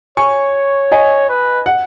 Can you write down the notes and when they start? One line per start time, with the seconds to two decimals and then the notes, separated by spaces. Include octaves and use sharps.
0.17 C#5 G#5 C#6
0.92 D#5 G#5
1.29 B4
1.66 F#5